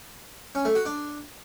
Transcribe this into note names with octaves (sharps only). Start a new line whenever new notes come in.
C#4
A3
F#4
D4